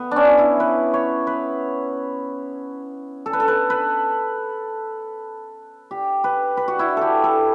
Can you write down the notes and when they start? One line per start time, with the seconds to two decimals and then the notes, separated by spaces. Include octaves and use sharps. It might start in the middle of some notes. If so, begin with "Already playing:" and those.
Already playing: B3
0.11 C#4 D4
0.38 E4
0.60 B4
0.94 C#5
1.27 B4
3.26 A4
3.33 B4
3.40 A4
3.48 B4
3.70 B4
5.91 G4
6.24 B4
6.57 B4
6.68 F#4
6.79 E4
6.97 G4 A4
7.24 A4